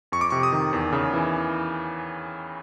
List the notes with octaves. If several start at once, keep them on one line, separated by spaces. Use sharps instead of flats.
F2 C#6
D6
C3 C#6
D#6
D#3
E2
C#3
E3